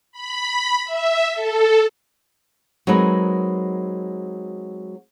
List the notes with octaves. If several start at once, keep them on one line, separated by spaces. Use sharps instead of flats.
B5
E5
A4
F#3 G#3 C4 D#4 A#4 B4